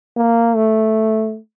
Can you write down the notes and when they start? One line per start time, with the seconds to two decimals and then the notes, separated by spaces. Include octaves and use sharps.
0.17 A#3
0.56 A3